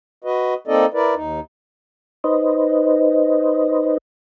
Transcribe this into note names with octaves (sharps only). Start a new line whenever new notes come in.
F#4 B4 D#5
A#3 C4 D#4 A4 D5 D#5
E4 A#4 B4 D5
D#2 D#4
D#4 B4 C5 D#5